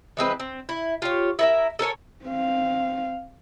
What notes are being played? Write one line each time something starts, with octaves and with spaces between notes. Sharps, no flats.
E3 G#3 C4 B4
C4
E4
F4 G4 C#5
E4 A#4 E5
A4 A#4 C#5 G#5
C4 F5